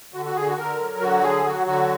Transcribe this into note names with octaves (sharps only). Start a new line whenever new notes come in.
D3 F#4
F#4
D3 G#4
F#4
D3 A#4
F#3
D3 F#4
F#3 G#4
F#3 F#4
D3 F#4